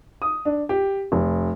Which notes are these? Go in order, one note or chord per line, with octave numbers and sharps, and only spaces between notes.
D#6
D4
G4
F1